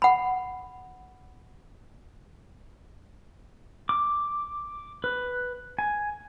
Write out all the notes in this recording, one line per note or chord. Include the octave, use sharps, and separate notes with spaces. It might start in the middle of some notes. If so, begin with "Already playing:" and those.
F#5 B5
D6
B4
G#5